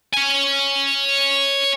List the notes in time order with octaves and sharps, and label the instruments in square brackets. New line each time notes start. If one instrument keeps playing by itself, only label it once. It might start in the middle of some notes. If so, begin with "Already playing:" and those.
[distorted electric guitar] C#5 G#5